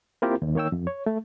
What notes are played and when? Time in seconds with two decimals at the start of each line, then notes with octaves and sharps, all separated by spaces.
0.22 A#3 C4 E4 F4 G4 A#4
0.42 D#2
0.55 D#3 A#3 C#5 G5 E6
0.72 F2
0.87 C#5
1.06 A3